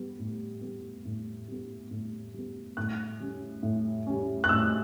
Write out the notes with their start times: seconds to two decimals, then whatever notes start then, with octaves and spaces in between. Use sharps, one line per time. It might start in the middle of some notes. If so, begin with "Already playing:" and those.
Already playing: G3 B3
0.19 A2
0.62 G3 B3
1.05 A2
1.48 G3 B3
1.91 A2
2.34 G3 B3
2.77 A2 F#6
3.20 G3 C#4
3.63 A2
4.06 G3 C#4
4.44 F#6
4.49 A2 E6